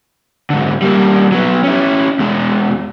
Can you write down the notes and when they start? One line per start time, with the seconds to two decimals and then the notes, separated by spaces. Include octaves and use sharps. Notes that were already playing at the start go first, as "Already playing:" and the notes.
0.50 G#2 D3
0.82 G3 A#3
1.32 F#3 B3
1.64 C#4 E4
2.19 E2 G#3